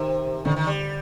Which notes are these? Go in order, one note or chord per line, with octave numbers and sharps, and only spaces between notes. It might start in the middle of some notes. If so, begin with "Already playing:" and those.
Already playing: C3 D#3
D3 D#3
D#3
G3